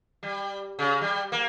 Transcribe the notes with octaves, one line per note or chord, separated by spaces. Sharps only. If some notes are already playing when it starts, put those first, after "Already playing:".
G3
C#3
G3
A#3